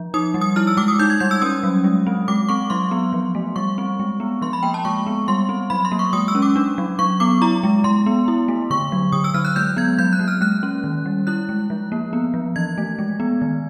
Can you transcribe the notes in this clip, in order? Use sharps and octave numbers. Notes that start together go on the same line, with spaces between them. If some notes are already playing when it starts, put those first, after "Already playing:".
Already playing: F3
D#4 D#6
G3
D#6
E4 F6
E6
G#3 D6
D#6
D#4 G6
G#6
G3 G6
E6
C#4 D#6
F#3
G#3
C4
G#3 D6
C4 C#6
F#3 C6
B3
F3
A3
G3 C#6
C4
G#3
B3
F3 C6
B5
A#3 G5
A5
G#3 C#6
B3
G3 C6
C4
F#3 B5
C6
A#3
C#6
G#3 D#6
E6
C#4
D6
D4
F#3
F#3 C#6
B3 D6
E4 A#5
G#3
G#3 C6
B3
E4
A3
D3 C#6
F#3
D3 D#6
E6
F#3 F6
F#6
G#3 G6
B3 G#6
F#3 G6
F#6
A#3
F6
G#3 F#6
C#4
D#3
G3
E4 F#6
G#3
F3
A#3
B3
F3
E3 G#6
A3
G#3
B3
D#3